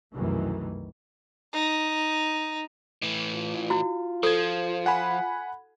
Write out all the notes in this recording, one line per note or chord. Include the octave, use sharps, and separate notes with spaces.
C2 F#2 B2 D#3 E3 A3
D#4
A2 E3
F4
E4 F#4
F3 A4 C5 G#6
F#5 G#5 B5